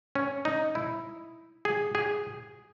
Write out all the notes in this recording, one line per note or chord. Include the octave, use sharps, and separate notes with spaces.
C#4
D#4
E4
G#4
G#4